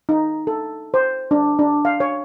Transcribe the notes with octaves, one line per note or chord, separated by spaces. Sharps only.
D#4
A4
C5
D4
D4
F5
C#5